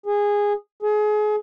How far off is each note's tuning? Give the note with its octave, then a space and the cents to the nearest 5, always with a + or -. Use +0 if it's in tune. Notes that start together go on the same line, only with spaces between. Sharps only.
G#4 -15
G#4 +30